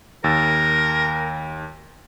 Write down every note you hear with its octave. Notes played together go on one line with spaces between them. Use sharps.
D#2 A#4 E6 A6